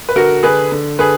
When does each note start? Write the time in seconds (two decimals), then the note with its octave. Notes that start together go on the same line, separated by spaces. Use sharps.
0.09 B4
0.16 D3 F#4 A#4
0.43 D3 G#4 B4
0.72 D3
0.99 D3 G#4 B4